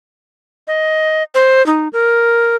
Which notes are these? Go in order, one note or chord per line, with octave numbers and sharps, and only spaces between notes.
D#5
C5
D#4
A#4